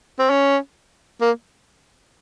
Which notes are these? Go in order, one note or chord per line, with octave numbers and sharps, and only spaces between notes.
C4
C#4
A#3